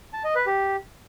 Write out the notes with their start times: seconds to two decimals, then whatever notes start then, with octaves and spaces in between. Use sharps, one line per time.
0.13 A5
0.24 D#5
0.35 B4
0.46 G4